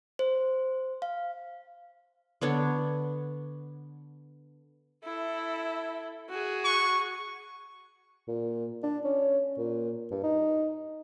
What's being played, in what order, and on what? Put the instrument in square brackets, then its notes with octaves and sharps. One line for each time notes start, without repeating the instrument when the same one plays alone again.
[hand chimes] C5
F5
[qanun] D3 B3 D4 C#5
[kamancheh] E4 A4
F#4 G#4
[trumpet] C#6
[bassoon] A#2
D4
C#4
A#2
G2
D#4